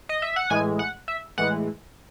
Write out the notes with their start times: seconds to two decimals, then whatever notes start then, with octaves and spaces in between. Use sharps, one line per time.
0.09 D#5
0.22 E5
0.36 F#5
0.50 A2 E3 G#3 G#5
0.79 F#5
1.08 E5
1.38 A2 E3 G#3 F#5